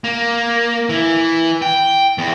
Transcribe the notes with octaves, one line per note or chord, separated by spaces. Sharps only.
A#3
E3
G5
E2